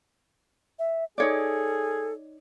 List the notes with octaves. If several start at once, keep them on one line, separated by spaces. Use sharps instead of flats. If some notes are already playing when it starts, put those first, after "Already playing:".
E5
D#4 G#4 A4 C#5 D5